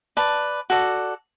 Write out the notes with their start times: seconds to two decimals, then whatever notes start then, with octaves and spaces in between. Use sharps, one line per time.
0.17 B4 D5 A5
0.70 F#4 A4 D5